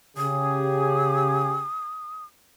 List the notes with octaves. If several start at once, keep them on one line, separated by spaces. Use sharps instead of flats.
C#3 G4 G#4 D#6